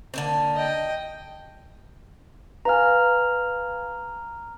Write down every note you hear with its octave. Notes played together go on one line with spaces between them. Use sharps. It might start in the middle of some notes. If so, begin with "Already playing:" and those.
D3 A#3 C4
D#5 G5
B4 F5 G#5 A#5 F6